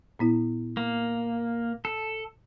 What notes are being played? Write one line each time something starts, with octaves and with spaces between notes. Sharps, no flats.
A#2 B3 E4
A#3
A4